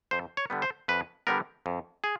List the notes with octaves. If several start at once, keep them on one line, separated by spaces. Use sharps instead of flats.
F2 C5
C#5
D3 G3 B3
C5
F2 B4
D3 G3 B3 A#4
F2
G#4